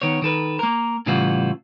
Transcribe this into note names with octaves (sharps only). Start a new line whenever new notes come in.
D#3 B3 C#5
D#3 A4 B4
A#3 A#4
A2 C#3 E3 G3 F4 F#4